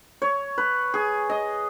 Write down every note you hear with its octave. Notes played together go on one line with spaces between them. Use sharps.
C#5
B4
G#4
D#5